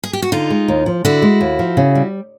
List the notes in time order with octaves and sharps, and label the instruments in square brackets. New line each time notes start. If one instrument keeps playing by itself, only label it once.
[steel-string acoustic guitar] G#4
G4
F#4
[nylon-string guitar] D3 [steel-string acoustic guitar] D#4 F4
[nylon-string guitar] G#3
D#2
F3
[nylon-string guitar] D3 [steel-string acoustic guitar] E4 F#4
[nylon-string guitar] G#3
D#2
F3
C#3
G3